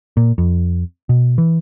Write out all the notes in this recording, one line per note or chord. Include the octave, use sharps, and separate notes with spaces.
A#2
F2
B2
E3